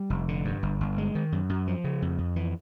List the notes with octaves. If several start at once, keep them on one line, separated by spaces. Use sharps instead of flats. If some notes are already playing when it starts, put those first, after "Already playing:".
Already playing: G3
F1
D3
G2
G1
G1
G#3
D#3
F#2
F#2
F3
C#3
F2
F2
E3